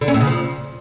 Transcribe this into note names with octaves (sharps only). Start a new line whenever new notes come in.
D3
C#4
A2
C#3
F3